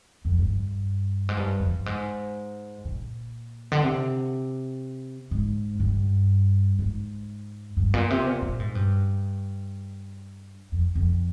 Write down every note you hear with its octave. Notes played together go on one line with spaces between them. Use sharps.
F2
G2
G#2
G2
F2
G2
G#2
A#2
D3
C3
G#2
G2
G#2
G2
A#2
C3
A#2
A#2
G#2
G2
F2
F2